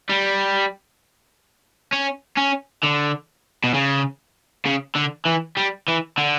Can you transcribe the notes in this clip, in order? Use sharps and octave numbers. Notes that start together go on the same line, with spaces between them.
G3
C#4
C#4
D3
B2
C#3
C#3
D3
E3
G3
E3
D3